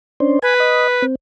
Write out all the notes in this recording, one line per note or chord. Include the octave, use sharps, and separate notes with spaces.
C#4 D4 C5
B4 G#5
D#5
C4